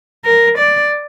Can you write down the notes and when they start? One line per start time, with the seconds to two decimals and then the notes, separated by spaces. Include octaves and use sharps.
0.25 A#4
0.58 D5